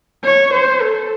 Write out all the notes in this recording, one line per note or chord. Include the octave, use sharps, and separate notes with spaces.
C#5
C5
A4